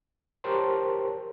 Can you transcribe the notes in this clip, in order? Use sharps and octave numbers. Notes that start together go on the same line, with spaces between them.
G4 A#4 C5 C#5 A5 C6